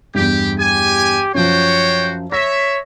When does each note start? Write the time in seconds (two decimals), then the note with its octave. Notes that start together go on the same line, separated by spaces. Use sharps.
0.14 E2 G2 G4
0.59 G4 G#5
1.34 F#2 F3 F#4 C5 C#5 G5
2.32 C#5 E5 A#6